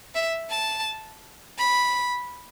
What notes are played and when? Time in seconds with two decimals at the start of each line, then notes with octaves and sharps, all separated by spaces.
0.15 E5
0.50 A5
1.58 B5